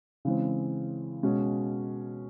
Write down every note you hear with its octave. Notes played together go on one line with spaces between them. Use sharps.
C#3 E3 G#3 C4
B2 G#3 C#4